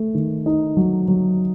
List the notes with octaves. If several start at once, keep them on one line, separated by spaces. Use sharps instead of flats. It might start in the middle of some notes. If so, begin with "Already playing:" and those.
Already playing: A3
D#3
D#4
F#3
F#3